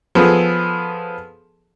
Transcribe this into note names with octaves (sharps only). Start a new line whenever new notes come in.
F3 B3 G#4 A4